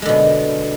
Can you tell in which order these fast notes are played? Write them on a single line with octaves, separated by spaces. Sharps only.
G#3 D3 B2